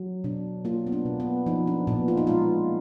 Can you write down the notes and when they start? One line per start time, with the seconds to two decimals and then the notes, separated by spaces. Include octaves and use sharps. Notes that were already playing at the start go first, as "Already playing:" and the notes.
Already playing: F#3
0.24 B2 D4
0.65 A#3 F4
0.87 B3
0.92 D4
1.06 B2
1.20 B3
1.46 F3 D#4
1.67 D4
1.87 A#2 B3
2.08 F4
2.17 D#4
2.27 G#3 F4